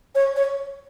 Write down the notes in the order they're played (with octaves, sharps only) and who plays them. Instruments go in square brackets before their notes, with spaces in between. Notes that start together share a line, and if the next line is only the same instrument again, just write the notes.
[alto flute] C#5
C#5